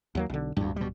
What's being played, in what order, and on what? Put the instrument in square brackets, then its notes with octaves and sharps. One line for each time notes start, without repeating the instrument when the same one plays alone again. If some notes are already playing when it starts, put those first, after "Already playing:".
[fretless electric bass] D#2 F#3 A#3
B1 D3
[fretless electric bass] D1 [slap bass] D2 G2
[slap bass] B2 G3